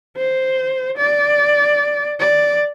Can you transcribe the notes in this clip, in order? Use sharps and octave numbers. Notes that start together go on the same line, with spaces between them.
C5
D5
D5